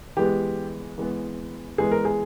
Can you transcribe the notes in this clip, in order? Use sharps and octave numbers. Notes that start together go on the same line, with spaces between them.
E3 G#3 B3 G4
E3 G#3 B3
E3 G#3 B3 G#4
A#4
G#4